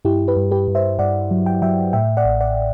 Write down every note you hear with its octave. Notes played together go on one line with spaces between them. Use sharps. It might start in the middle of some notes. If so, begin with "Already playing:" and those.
G2 E4 G4
G4 B4
G2
G4 B4
G2
C5 E5
G2 D5 F#5
F#3
G5
F#3 E5 G5
A2 E5 G5
D5 F#5
A1
D5 F#5